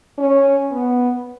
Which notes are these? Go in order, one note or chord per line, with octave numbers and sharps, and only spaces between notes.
C#4
B3